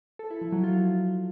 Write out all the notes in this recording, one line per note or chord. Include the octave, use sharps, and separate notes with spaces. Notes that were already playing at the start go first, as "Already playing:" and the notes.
A4
E4
F3
F#3
F4